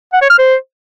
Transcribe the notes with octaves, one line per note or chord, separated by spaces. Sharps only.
F#5
C#5
F6
C5